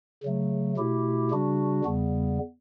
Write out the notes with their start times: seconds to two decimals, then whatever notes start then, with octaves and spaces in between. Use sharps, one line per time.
0.23 C#3 F#3 A3
0.77 B2 A3 E4 G4
1.31 C#3 G3 D4 F#4
1.85 E2 C#3 G3 B3